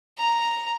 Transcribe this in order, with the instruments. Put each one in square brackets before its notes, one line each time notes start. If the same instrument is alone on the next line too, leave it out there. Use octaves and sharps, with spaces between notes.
[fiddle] A#5